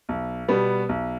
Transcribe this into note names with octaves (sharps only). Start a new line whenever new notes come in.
B1
B2 G3 B3
B1